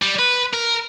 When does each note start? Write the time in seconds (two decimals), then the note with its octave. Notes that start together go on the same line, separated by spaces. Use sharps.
0.02 G3
0.19 B4
0.53 A#4